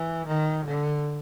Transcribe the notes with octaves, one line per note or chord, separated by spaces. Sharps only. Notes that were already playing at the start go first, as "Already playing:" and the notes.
Already playing: E3
D#3
D3